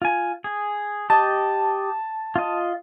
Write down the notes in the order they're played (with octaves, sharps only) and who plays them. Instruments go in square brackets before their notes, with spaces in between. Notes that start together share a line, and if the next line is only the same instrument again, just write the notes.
[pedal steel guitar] F4 G#5
G#4
[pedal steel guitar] G4 D#5 [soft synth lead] A5
[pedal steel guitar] F4 D#5